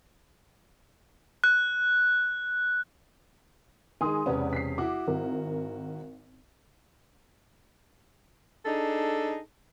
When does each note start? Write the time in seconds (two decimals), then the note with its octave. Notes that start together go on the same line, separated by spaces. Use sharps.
1.44 F#6
4.01 D#3 G#3 G#5 C6 D#6
4.26 E1 C3 C#4 B4 D5 F#5
4.53 B6 C7
4.78 E4 F#4 D6
5.07 G#1 A#4
8.65 D4 D#4 G#4 A4